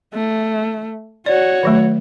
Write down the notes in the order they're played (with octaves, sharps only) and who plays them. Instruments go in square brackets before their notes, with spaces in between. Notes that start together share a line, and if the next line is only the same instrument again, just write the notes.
[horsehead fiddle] A3
[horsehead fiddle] F#4 C#5 [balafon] D5
[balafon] D#3 F#3 A3